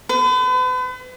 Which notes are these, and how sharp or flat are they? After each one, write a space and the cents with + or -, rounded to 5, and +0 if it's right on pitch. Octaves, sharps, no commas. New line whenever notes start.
B4 +40